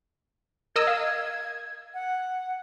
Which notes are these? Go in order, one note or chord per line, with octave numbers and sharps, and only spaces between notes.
A#4 D#5 E6 G#6
F5
F#5